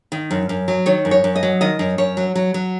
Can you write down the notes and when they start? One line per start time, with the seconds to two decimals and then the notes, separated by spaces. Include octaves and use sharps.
0.12 D#3
0.31 F#2
0.49 F#2
0.68 F#3
0.86 D#3 C#5
1.05 F#2
1.11 C#5
1.24 F#2
1.36 D#5
1.43 F#3
1.61 D#3 D#5
1.79 F#2
1.98 F#2 C#5
2.17 F#3
2.35 F#3
2.54 F#3